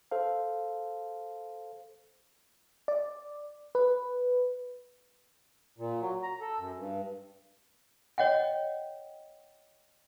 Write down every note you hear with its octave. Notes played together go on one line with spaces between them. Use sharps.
A4 C5 F5
D5
B4
A#2
F#3
A#5
A4
F#2
G2
C#5 D#5 F#5 G5